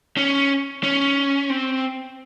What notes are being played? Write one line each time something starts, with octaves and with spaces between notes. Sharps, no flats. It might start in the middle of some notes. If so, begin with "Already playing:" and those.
C#4
C#4
C4